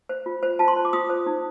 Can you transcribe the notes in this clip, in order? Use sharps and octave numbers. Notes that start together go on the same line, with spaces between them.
C5
F4
C5
F4 A5
C6
C5
D6
F4 D#6
C5
D#4